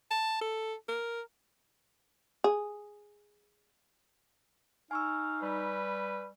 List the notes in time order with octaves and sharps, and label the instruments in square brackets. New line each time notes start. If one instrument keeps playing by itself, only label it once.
[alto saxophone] A5
A4
A#4
[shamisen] G#4
[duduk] D#4 [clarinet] F5 [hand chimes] G#5 C#6 E6
[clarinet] G3 [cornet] B4